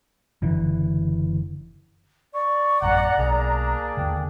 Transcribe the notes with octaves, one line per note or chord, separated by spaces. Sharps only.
F#1 D3 E3
D5 C#6
A1 F#2 F#5 A#5
B1 A#3 D4 G#4
D#2 D3 G5